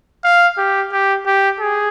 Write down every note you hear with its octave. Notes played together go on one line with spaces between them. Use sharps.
F5
G4
G4
G4
G#4